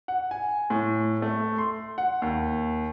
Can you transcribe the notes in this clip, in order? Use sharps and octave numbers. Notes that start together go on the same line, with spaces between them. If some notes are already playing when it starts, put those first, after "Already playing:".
F#5
G#5
A2
A3
C6
F#5
D#2